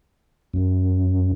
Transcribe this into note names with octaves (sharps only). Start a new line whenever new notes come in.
F#2